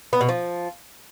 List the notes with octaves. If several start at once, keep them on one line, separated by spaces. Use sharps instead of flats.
B3
B2
F3